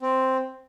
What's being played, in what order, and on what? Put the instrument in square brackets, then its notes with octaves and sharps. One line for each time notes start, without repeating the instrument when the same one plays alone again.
[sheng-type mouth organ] C4